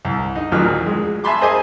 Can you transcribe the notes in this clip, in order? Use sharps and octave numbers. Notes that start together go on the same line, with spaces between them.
C2
D#4
A1 D2 D#3 F3 F#3 F6
G#3
E5 G#5 A5 B5 C6 D6
G#4 C5 D#5 E5 G#5 D6